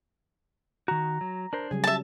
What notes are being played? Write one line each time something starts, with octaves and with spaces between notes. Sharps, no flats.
D#3 F#4 A#5
F#3
D4 A#4 C5
C#3 F#3 G3 G#4
E5 A5